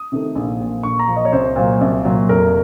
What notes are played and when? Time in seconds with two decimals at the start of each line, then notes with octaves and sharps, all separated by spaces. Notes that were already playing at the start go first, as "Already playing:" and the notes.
Already playing: D#6
0.12 C3 D#3 A3
0.35 A#1
0.60 A#2 F3
0.83 A#1 C#6
0.99 A#5
1.08 A#2 F3
1.16 D#5
1.25 C#5
1.32 C2 C5
1.56 A#2 F#3
1.81 C2
2.05 A#2 F#3
2.29 F1 A#4